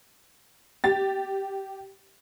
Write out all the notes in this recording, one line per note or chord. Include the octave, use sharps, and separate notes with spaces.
G4 A6